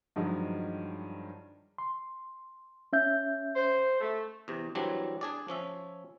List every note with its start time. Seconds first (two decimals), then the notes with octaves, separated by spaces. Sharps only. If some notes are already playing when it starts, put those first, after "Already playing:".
0.16 G2 D#3 F3 F#3 G#3
1.78 C6
2.93 C#4 E5 G6
3.55 C5
4.01 A3
4.48 E2 C3
4.75 E3 F#3 G3 C4 D4
5.21 D4 G#4 D5
5.48 F3 C#4 E5